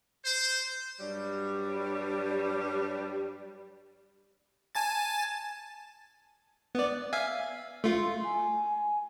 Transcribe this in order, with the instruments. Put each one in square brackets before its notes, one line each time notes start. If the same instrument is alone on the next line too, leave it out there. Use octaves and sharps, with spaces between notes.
[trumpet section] C5
[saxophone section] G2 F#3 G3
[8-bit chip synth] G#5 A5 A6
B3 D5
E5 F5 G#5
[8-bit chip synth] A3 F4 [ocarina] C6
[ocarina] G#5